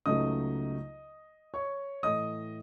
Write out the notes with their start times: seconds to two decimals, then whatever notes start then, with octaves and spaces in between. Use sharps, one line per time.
0.06 C#2 C#3 F#3 A3 D#4 D#5 D#6
1.54 C#5 C#6
2.03 A2 E3 A3 D#5 D#6